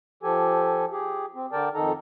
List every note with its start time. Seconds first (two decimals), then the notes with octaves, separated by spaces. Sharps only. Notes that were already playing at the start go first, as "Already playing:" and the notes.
0.23 F3 G4 A4 G#5
0.91 G4 G#4
1.35 C4
1.52 D3 A#4 D5 G5 A5
1.74 F2 D#3 D#4 A4 A#5